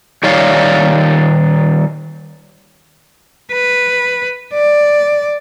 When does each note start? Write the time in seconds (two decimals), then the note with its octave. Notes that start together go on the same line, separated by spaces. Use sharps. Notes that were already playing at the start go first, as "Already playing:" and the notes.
0.23 D#3 G3 D#4 C#5 D5 F5
3.52 B4
4.54 D5